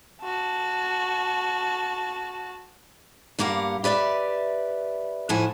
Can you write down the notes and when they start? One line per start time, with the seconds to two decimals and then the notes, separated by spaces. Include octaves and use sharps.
0.22 F#4 A5
3.39 G2 A#3 G4 F5 F#5
3.84 G4 B4 D5 E5
5.29 F2 A2 F3 E4 F#5 G#5